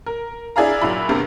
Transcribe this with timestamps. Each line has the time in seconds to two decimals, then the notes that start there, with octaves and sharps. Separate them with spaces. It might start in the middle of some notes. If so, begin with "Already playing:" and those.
0.06 A#4
0.56 D4 E4 G#4 D5 F5 A#5
0.82 A#2 F#3 E4 F#4 B5
1.09 E2 G2 C3 A#3